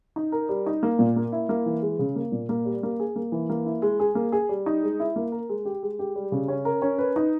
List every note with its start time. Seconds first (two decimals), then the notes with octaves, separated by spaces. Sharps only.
0.16 D#4
0.32 A#4
0.49 G3
0.66 D#4
0.83 A#3
0.99 A#2
1.16 A#3
1.32 E4
1.49 A#3
1.66 E3
1.82 G#3
1.99 C#3
2.16 A#3
2.32 A#2
2.49 A#3
2.65 G3
2.83 A#3
3.00 G#4
3.16 A#3
3.32 E3
3.49 A#3
3.66 E4
3.82 G#3
4.00 G#4
4.15 A#3
4.32 G#4
4.49 G3
4.66 D#4
4.83 G#3
5.00 E4
5.16 A#3
5.32 A#4
5.49 G#3
5.65 G4
5.83 G#3
5.99 G4
6.16 G3
6.32 C#3
6.48 C#4
6.65 A#4
6.82 C#4
6.99 B4
7.16 D#4